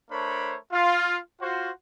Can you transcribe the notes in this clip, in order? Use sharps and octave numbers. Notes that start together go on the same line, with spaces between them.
A3 D4 A#4 C5 C#5 B5
F4
F4 F#4 C5